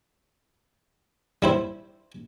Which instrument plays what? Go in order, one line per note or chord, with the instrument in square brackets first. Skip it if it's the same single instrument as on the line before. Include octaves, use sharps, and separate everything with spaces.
[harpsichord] G3 E4 C5